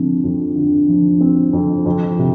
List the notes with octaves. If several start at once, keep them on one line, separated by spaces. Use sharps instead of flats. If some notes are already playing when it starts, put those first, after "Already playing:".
Already playing: D3 F3 C4
F2
D3
F3
C4
F2
F2
C3